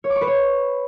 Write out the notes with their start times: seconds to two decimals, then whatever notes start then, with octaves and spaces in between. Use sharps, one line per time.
0.04 C#5
0.10 D6
0.16 C#6
0.21 B4
0.27 C#5